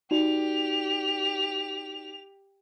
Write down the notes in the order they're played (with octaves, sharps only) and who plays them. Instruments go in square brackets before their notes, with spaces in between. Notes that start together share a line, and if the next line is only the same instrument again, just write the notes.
[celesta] D#4 F#4 D5 [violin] G4 F7